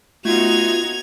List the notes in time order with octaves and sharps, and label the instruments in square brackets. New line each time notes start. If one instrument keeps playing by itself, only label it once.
[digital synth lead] A3 [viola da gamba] B3 D#4 F#4 [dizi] F4 [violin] G#6 F7